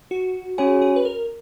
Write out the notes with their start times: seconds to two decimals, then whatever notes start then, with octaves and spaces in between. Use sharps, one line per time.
0.11 F#4
0.58 C#4 F#4 G#4 C#5 G#5
0.81 G#4
0.96 B4
1.05 A#4